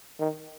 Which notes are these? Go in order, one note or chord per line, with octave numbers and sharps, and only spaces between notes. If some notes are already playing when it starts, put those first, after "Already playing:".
D#3